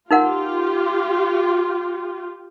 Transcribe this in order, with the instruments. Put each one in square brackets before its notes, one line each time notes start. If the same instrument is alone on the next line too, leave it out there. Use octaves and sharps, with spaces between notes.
[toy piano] D#4 A#4 F#5 [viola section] F4 G4